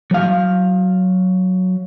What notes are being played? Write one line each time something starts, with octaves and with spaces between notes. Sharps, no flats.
F#3 F5